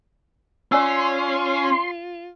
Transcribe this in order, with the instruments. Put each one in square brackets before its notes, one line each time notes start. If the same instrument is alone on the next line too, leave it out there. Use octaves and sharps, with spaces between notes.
[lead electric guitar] C#4 [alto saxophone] F4 [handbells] D5 G#5 E6 [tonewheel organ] C6